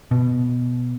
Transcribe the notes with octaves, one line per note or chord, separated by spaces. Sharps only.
B2